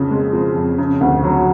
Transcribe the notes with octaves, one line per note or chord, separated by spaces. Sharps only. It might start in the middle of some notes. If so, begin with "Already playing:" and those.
Already playing: F2 C#3 F3
G#3
F3
F2
C#3
D2
F#3